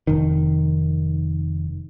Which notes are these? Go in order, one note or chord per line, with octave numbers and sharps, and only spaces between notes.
F1 D#3